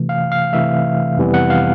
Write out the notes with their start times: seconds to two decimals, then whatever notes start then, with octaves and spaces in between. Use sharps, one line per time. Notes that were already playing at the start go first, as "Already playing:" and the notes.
Already playing: C3 E3 A3
0.09 F5
0.32 F5
0.53 C3 E3 A3 E5
1.17 F2 C3 E3 G3 B3
1.34 F#5
1.50 F5